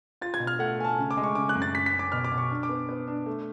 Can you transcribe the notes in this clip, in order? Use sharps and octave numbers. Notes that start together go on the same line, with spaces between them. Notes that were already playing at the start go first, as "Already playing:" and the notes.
F4 A6
G#6
B2
F6
A3 F#5
A3 G#5
A5
C#3
D6
G#3
C#6
C#3 D6
F#6
F#2
A6
C#4 B6
B6
C#4
D6
B2 F6
D6
B2
C#6
D4
D6
B3
B3
D4
A3